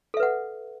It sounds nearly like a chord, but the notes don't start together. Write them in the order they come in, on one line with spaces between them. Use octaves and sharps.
A4 E5 B4 F#5